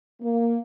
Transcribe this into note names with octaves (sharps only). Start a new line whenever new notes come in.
A#3